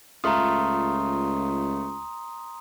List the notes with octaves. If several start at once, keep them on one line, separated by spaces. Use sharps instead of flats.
C#2 A3 F4 A#5 C6 D#6